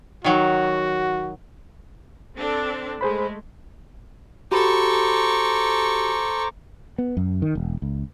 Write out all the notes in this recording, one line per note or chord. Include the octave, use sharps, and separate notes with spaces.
D#3 F#3 F#4
C4 D4 A4
G#3 A3 G#4 C5 B5
F#4 G4 A4 C5 A#5 B5 C#6 D6
B3
F#2
D#3
E1
C#2